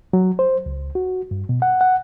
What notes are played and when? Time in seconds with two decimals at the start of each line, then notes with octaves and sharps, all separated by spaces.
0.13 F#3
0.39 C5
0.66 C#2
0.95 F#4
1.31 G2
1.49 B2
1.62 F#5
1.81 F#5